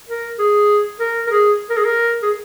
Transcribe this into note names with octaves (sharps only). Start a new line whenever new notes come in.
A#4
G#4
A#4
A#4
G#4
A#4
G#4
A#4
G#4